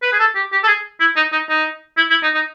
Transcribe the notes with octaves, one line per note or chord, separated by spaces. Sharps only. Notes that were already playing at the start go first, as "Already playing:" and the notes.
B4
G#4
A4
G4
G4
A4
G#4
E4
D#4
D#4
D#4
E4
E4
D#4
D#4